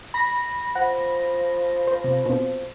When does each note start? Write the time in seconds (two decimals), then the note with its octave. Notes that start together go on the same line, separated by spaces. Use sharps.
0.14 B5 A#6
0.75 F3 F#5
1.87 C5
2.04 C3
2.26 B2 C4